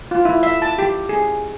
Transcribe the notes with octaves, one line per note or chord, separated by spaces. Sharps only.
F4
E4
E5
A5
G4
G#4